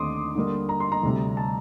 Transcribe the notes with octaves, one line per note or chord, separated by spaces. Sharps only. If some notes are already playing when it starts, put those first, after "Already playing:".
Already playing: D#2 D3 A3 C4 D#4 C6 D6 D#6
D3 G3 A#3
A#5
C6
A#5
D2 C3 G3
A5